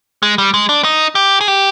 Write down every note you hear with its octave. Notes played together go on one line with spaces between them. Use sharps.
G#3
G3
G#3
D4
D#4
G4
G#4
G4